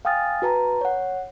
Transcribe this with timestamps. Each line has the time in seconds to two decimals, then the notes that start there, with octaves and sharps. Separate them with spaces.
0.05 F5 G5 G#5 D#6 F6 A6
0.42 F#4 B4 A5 A#5
0.81 C#5 F#5